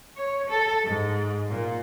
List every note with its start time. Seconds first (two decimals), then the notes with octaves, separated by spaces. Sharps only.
0.17 C#5
0.50 A4
0.85 G#2
1.49 A#2